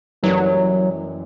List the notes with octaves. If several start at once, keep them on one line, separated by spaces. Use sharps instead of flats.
F#1 F#2 E3 F#3 G3